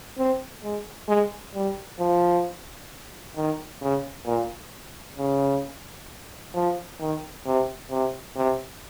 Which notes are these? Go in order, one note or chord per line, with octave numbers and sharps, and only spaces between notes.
C4
G#3
G#3
G3
F3
D#3
C#3
A#2
C#3
F3
D#3
C3
C3
C3